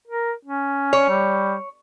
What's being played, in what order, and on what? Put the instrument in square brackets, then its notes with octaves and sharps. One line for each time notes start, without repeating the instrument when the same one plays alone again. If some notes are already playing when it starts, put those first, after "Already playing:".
[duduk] A#4
C#4
[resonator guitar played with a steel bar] C#5
[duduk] G3